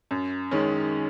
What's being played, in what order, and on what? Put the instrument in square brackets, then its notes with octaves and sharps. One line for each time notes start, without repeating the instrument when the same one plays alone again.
[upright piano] F#2
D#3 G#3 C#4